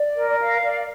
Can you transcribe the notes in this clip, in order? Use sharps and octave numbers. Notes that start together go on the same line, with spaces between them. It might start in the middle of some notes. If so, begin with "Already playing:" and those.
Already playing: D5
A#4
F5
D5